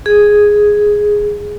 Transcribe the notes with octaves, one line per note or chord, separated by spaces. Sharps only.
G#4